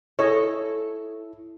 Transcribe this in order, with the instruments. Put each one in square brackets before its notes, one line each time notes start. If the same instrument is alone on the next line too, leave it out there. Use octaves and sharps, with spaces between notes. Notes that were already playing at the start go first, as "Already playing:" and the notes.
[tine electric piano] E4 [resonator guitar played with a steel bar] A4 [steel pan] C#5 D#5